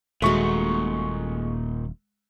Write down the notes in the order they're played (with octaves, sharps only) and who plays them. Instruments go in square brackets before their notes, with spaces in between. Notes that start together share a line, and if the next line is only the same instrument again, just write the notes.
[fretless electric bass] D#1 [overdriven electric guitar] A#2 D#3 [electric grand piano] G#3 C#6 [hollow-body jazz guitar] A3 F#4